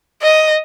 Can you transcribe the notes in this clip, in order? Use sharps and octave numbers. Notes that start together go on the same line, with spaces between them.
D#5